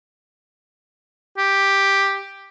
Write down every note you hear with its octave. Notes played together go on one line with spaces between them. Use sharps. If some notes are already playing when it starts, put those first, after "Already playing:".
G4